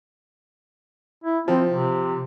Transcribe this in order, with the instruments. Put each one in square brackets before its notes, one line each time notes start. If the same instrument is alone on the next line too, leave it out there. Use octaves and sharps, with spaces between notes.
[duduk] E4
[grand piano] F3 [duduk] C4
[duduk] C3